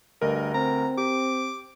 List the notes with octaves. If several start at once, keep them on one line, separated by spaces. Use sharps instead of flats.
D2 G2 A#4 D#5
C4 A#5
G4 D6